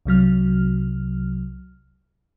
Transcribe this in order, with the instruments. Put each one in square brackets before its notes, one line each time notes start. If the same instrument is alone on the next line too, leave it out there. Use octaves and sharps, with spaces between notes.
[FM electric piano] C2 C3 F#3 F6